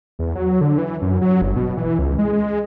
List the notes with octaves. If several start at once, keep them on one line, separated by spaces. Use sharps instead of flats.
E2
F#3
D3
E3
F#2
F#3
G1
B2
E3
C#2
G#3
G#3